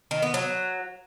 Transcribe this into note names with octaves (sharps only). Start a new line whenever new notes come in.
D#3
B3
F#3